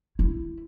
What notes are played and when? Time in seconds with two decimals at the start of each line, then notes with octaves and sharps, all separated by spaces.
0.19 E4